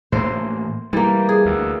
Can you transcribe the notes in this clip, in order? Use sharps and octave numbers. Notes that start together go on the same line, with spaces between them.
A2 E3 A#3 C5
E3 G3 A#3
G#4
D2